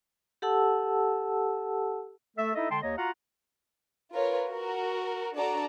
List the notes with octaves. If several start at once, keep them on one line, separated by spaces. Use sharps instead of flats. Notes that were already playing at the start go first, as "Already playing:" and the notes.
G4 A4 F#5 A5 E6
A3 A4 E5
D#4 E4 A4 D#5 E5
D3 G#3 G5 A5 C6
D#2 A#3 C#5 D#5
F4 F#4 F5 F#5 A#5
F4 A#4 B4 C#5
F#4 A#4
D4 F#4 A4 D5 A5 A#5